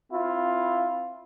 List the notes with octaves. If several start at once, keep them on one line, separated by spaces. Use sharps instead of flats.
C4 E4 F4